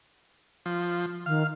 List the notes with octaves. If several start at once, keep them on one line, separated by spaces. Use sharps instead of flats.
F3
D#3 F5